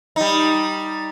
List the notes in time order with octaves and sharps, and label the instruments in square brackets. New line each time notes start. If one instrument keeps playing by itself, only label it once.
[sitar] G3 D#4